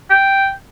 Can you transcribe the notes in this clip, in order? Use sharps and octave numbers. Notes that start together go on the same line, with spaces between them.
G5